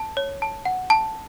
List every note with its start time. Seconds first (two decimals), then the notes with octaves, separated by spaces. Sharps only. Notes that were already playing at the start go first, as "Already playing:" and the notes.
Already playing: A5
0.17 C#5
0.42 A5
0.65 F#5
0.90 A5